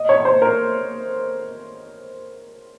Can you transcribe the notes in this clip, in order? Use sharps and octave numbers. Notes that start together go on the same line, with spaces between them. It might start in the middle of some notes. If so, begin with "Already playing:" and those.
Already playing: D#5
C#5
C#5
C5
A#4